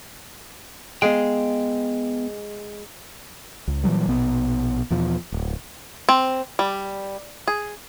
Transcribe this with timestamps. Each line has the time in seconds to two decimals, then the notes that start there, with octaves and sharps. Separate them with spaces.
1.02 G#3 B3 G#4 F5 G5
3.68 C#2
3.84 A#2 E3 F#3 G3
4.08 A#1 B2 B3
4.91 E2 B2 F3
5.32 D1
6.09 C4
6.59 G3
7.47 G#4